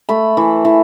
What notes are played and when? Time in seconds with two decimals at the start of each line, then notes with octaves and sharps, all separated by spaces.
0.09 A3 B5
0.37 E3
0.65 E3